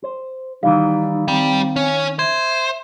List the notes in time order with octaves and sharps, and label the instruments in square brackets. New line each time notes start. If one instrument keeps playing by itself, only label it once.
[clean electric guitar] C5
[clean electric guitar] D#3 E3 G3 [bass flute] D#4 [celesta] F5
[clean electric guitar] D#3 [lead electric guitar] G3 [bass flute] C4
[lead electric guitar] C#4
[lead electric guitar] C5 [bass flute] E5 [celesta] G#6